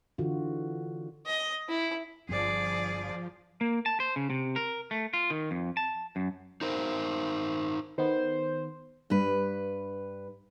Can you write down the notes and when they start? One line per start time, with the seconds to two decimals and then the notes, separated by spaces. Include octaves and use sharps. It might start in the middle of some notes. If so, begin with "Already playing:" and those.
0.18 D3 E3 F4 F#4
1.26 D#5
1.69 E4
2.29 G1 G2 F3 C4 G#4 D5
3.61 A#3
3.86 A5
4.00 C5
4.16 C#3
4.30 C3
4.56 A#4
4.91 A3
5.13 F4
5.30 D#3
5.51 F2
5.77 A5
6.16 F#2
6.61 D#4 A#4 C5
7.98 D#3 B3 C5
9.10 G2 B4